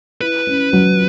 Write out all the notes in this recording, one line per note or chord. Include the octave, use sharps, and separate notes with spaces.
E4 B4
C#4
F#3